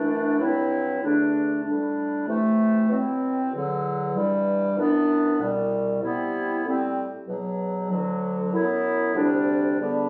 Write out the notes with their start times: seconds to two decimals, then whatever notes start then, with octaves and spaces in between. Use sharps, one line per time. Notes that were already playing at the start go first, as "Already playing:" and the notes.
Already playing: F#2 E3 A3 D4
0.39 G2 F#3 C4 E4
1.02 E2 D3 A3 D4
1.64 A2 G3 D4
2.27 C3 E3 A3
2.89 B2 F#3 C4 E4
3.52 E2 D3 F#3
4.15 G2 E3 G3
4.77 F#2 E3 B3 D4
5.39 C2 B2 G3
6.02 C3 G3 B3 E4
6.64 A2 G3 C4
7.27 E2 B2 F#3
7.89 D2 D3 F#3
8.52 F#2 F#3 B3 E4
9.14 D2 C3 G3 D4
9.77 E2 D3 G3 B3 D4